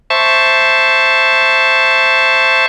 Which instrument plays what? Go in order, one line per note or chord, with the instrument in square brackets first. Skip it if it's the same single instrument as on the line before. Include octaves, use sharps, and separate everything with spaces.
[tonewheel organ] C5 E5 A5 C#6